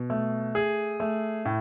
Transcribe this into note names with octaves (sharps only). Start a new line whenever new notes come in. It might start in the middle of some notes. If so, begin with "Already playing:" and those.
Already playing: B2
A3
G#4
A3
A2